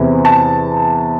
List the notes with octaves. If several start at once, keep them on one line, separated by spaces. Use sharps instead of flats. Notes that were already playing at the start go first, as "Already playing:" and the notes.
Already playing: E2 C3 E3
A5